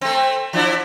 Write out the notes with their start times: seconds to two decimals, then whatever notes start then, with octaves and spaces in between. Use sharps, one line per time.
0.01 A3 C4
0.53 F3 D4 E4